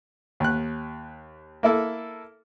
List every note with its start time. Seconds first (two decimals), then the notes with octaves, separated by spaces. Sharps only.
0.40 D#2 F#6
1.63 A#3 E4 A4